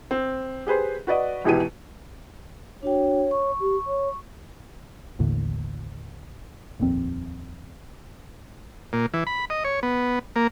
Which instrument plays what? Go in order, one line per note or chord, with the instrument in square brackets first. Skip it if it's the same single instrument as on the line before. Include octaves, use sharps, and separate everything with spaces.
[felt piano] C4
G4 G#4 B4 C5
F#4 B4 D5 D#5
G#1 E2 B2 E3 G4 D#7
[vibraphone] D4 F#4 G5 [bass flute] C#5
[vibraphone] C#6
[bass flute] G4
C#5
[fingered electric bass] A1 D#2 A2 D3
D#1 A#1 F2 C4
[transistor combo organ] A#2
E3
B5
D#5
C#5
B3
A#3